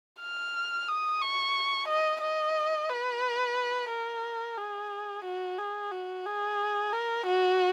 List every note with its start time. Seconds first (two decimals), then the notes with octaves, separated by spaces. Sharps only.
0.20 F6
0.88 D#6
1.21 C#6
1.88 D#5
2.21 D#5
2.89 B4
3.90 A#4
4.58 G#4
5.25 F#4
5.58 G#4
5.92 F#4
6.26 G#4
6.93 A#4
7.26 F#4